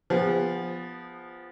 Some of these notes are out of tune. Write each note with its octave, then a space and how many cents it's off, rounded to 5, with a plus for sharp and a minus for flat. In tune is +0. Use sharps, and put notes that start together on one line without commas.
F3 +0 B3 +0 G#4 -40